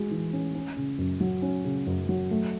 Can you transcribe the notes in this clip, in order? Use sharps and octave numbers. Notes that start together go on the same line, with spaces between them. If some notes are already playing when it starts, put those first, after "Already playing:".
Already playing: G#3 F#4
E3
C#4
C#4
C#3
F#2
F#3
C#4
C#3
F#2
F#3
A3